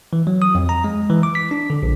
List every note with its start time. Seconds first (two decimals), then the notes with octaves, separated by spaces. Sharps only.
0.13 E3
0.27 F#3
0.42 D#6
0.55 F2
0.69 A#5
0.84 G#3
1.10 E3
1.23 D6
1.35 B6
1.51 D4
1.70 D3
1.83 A#1